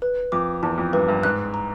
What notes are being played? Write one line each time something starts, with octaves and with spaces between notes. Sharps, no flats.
B4
F2 D6
E2 A5
F2
G2 B4
G2
G#2 F#6
A#5